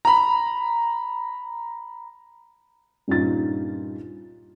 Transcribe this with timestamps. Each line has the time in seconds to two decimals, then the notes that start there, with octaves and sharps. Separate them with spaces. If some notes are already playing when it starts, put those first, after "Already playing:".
0.05 A#5 B5
3.08 G2 A#2 C#4 D#4 F4 A6